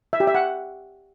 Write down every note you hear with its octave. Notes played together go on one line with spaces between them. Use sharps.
E5
G4
E5
F#5